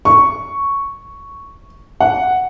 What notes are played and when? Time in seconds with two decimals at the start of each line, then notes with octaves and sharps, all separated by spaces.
0.05 C#6
2.01 F#5